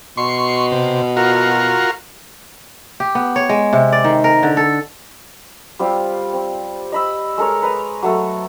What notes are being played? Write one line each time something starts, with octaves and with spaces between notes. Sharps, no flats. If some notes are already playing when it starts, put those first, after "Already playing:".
B2 C6 C#6
C3
F4 F#4 A#4
G4
B3
C#5
G#3
C3
D5
D#3
A#4
D3
A4
G3 C4 F4 G4
C4
D#5 B5 E6
G#3 A4 A#4 C#5
B4 A#5 D#6
F#3 A3 A4